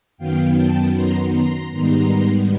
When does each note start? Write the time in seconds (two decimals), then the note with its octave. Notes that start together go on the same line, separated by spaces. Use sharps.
0.18 F#2 D#3 F#3 B3 F5 G5
0.56 G5 A5
0.95 A#5 C6
1.34 A#5 C6
1.72 G#2 D#3 G3 B3 A#5 C6